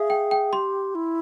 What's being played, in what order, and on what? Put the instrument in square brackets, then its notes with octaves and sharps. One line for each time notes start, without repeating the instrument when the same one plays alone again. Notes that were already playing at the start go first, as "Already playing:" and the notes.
Already playing: [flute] G#4 [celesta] E5 F5
[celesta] G5
G5
[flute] G4 [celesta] C6
[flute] E4